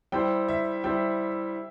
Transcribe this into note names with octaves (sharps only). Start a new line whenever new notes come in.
G3 E4 C5 G5
E5
G3 E4 C5 G5